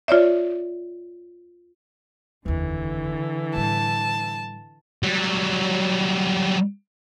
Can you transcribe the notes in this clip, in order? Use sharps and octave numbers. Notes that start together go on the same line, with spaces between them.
F4 C#5 D5 E5
F1 D#2 D3 E3
A2 G3 A5
F#3 G3